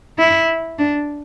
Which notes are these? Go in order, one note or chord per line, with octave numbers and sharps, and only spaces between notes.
E4
D4